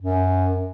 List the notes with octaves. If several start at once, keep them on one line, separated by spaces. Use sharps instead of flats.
F#2